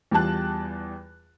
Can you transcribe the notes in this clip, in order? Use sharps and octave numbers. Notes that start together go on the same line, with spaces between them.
E2 G3 F4 G5 A5 F#6